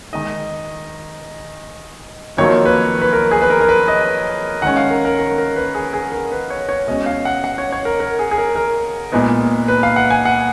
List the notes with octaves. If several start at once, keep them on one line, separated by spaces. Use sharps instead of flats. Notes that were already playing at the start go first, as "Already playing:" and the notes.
D#3 G#3 D#4 D#5
F2 D#3 F#3 A#3 F4 C#5
B4
B4
A#4
G#4
B4
A#4
A#4
B4
D#5
D#3 G#3 C#4 F#5
F5
A#4
A#4
A#4
A#4
B4
G#4
G#4
A#4
B4
C#5
C#5
B2 G#3 C#4 D#5
F5
F#5
F#5
C#5
C#5
A#4
A#4
G#4
G#4
A#4
A#4
A#2 G#3 B3 D#4
B4
F5
F#5
G#5
F#5